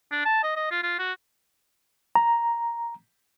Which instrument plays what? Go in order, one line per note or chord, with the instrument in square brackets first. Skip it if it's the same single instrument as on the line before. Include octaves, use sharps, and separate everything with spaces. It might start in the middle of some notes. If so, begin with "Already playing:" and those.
[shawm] D4
A5
D#5
D#5
F4
F4
F#4
[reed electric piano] A#5